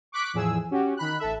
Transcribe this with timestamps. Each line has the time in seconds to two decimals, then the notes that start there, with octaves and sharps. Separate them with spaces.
0.12 C#6 D6 F#6 B6 D7
0.33 E2 A2 F3 G#4 E6
0.71 C#4 F#4 G4
0.97 D#3 B5 F#6
1.19 A1 A4 E5